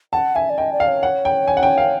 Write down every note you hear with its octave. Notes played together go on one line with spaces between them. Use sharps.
F#5 A5
E5 G#5
D5
D#5 G5
D5
F5
C#5
F#5
G5
G#5
F#5
G5
F5